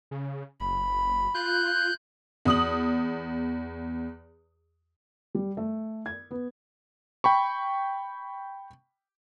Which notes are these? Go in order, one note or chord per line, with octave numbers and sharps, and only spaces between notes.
C#3
F#1 B5
F4 F#6 G6
E2 D#6 F#7
G3
A3
G#6
B3
G5 B5 C#6